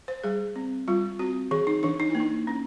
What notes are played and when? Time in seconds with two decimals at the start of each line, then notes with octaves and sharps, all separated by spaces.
0.08 C5
0.24 G3 G#4
0.56 C4
0.88 G3 F4
1.19 C4 F#4
1.51 E3 G#4
1.67 D#4
1.83 E3 D4
2.00 D#4
2.10 A#3 E4
2.20 D#4
2.47 C#4